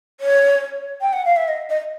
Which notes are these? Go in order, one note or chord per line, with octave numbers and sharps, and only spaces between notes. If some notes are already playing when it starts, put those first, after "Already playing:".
C#5
G5
F#5
F5
E5
D#5
D#5